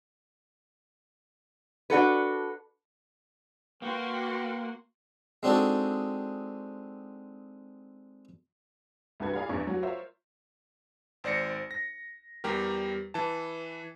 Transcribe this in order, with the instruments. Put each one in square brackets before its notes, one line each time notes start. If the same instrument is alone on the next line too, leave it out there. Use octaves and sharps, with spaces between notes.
[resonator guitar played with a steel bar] D4 F#4 A4 B4
[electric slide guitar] A#3 [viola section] F#4 F#5 C6 [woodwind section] B4 G5
[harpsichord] G#3 C4 D4 D#4 F#4 A4
[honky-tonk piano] C2 G2 F#4 A4 B4 G#6
E4 G#4 D5 F5 A#5 B5
A#1 E2 E3 D4 E4 C#6
F#3 F#4
F4 A#4 C5 C#5 E5
[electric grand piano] G#1 C5 D5 A#6 C#7
A#6
E2 G3 G4 A#4
E3 A5